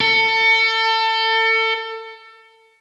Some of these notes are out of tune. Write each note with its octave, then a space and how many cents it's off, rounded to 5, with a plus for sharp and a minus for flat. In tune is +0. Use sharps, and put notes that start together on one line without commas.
A4 +30